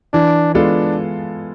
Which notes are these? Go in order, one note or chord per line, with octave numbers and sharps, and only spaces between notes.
E3 D4
G#3 B3 D4 F4 A4